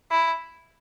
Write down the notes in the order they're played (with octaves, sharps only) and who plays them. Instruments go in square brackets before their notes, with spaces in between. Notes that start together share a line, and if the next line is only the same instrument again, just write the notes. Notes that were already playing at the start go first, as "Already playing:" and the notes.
[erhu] E4